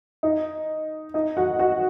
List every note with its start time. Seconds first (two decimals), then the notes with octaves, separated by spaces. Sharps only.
0.23 D#4
1.14 D#4 D#5
1.37 F#4 F#5
1.59 F#4 F#5